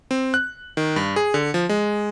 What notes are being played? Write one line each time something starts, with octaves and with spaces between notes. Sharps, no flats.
C4
F#6
D#3
G2
G#4
D3
F3
G#3